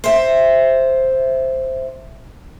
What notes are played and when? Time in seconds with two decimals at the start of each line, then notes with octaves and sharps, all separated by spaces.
0.04 C5 E5